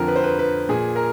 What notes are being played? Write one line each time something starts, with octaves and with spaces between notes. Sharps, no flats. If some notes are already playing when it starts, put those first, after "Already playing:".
Already playing: F2 D3 F3 A#4
B4
C5
B4
B4
A#2 F3 G#4
A#4